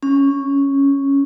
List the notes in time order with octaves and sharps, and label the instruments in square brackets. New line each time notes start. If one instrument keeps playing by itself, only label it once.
[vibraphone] C#4